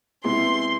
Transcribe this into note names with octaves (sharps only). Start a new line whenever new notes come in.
C3 G#3 B3 E4 C6